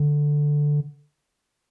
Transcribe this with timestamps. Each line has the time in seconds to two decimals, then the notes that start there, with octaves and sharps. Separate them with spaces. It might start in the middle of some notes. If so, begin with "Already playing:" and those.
Already playing: D3